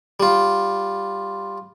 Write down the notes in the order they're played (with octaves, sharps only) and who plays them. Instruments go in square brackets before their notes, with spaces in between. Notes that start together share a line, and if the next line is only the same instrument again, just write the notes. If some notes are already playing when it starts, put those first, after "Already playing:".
[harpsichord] G3 F4